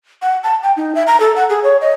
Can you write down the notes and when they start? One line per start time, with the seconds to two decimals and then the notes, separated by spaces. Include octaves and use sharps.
0.22 F#5
0.44 A5
0.63 G5
0.77 D#4
0.95 E5
1.07 A#5
1.20 A4
1.36 F#5
1.49 G#4
1.63 C#5
1.81 D#5